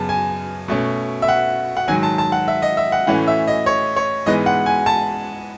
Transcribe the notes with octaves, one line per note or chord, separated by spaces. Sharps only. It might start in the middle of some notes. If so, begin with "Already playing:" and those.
Already playing: F#2 C#3 B3 A5
G#5
B2 A3 C#4
E5
F#5
F#5
G#2 D#3 F#3 G#5
A5
A5
F#5
E5
D#5
E5
F#5
A2 E3 A3 C#4 F#5
E5
D#5
C#5
C#5
G#2 E3 G#3 B3 D#5
F#5
G#5
A5